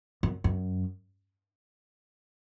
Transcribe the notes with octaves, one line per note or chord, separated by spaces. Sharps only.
F#2
F#2